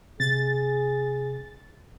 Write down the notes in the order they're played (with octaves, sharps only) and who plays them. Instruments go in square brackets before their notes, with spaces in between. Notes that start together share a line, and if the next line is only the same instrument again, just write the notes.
[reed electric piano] C3 [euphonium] G#4 [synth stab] A6